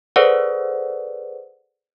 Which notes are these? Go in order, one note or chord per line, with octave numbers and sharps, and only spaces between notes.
G#4 A4 B4 C5 D5 F#5